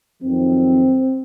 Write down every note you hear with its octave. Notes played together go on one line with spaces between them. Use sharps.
F2 D#3 F#3 C4